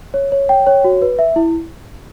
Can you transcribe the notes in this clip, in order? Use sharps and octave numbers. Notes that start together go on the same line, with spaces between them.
C#5
C#5
G5
C#5
F#4
B4
E5
E4